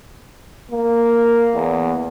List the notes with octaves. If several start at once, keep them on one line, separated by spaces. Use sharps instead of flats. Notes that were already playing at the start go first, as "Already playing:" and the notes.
A#3
E2